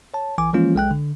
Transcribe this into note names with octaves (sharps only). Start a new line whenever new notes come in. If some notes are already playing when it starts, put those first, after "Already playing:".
C#5 A5
B1 E3 G#5 D6
E3 F3 G#3 A#3 C#4 F4
B1 G#3 G5 F#6
D3